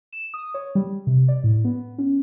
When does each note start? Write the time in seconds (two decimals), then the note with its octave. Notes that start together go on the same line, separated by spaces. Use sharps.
0.13 E7
0.34 D#6
0.54 C#5
0.75 G3
1.07 C3
1.28 D5
1.44 A2
1.65 B3
1.98 C#4